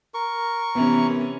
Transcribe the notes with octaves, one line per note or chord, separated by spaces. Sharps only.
A#4 C#6
C3 E3 B3 C#4